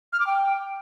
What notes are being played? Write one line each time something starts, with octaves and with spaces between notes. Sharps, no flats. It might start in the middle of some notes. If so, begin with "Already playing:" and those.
F6
D6
G5